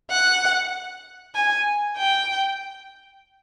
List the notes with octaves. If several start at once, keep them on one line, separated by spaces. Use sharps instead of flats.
F#5
G#5
G5